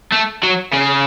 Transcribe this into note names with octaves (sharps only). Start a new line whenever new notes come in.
A3
F#3
C#3